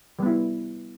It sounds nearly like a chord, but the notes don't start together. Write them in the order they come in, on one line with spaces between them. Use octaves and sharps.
G3 B3 E4